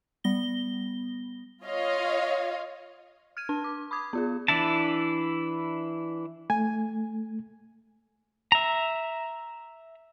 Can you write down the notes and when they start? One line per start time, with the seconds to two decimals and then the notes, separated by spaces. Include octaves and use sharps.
0.24 G3 B3 A#6 G7
1.65 F4 C#5 D#5 F5
3.37 F6 G#6 D#7
3.49 D4 A5
3.64 D6
3.91 B5 D6 D#6 G#6
4.13 B3 F4 G#4
4.48 E3 D4 E4 A5
6.50 A3 G#5
8.52 E5 A#5